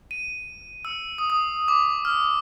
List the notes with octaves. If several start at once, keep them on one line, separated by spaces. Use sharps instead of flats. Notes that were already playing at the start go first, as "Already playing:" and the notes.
D#7
E6
D#6
D#6
D6
F6